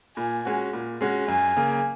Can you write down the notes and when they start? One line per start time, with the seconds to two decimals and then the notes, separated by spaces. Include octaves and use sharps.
0.17 A#2 G#5
0.45 G#3 C#4 F#4
0.73 A#2
1.01 G#3 C#4 F#4
1.28 F#2 G#5
1.56 C#3 A#3